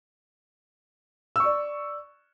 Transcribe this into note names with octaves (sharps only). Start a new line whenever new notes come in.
D5 C#6 E6